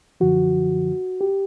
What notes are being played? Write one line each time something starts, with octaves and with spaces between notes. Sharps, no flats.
F#2 D3 F3 F#4
G4